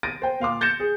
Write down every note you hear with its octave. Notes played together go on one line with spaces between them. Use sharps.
A6 A#6 D7 D#7
C5 G5
A#2 F5 C6 D6
G6 A6 A#6 C#7 E7
G#4